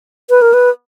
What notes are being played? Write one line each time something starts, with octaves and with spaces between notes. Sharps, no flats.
B4
A#4
B4